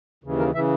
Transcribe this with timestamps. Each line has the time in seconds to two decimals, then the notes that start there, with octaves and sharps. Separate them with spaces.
0.24 D#2 C#3 E3
0.39 A#4
0.55 C#3 E3 E5